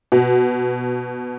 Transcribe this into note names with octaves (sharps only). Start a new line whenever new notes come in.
B2